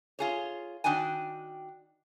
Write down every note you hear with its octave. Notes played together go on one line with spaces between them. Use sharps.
F4 G#4 C#5
D#3 D4 F#4 G5 G#5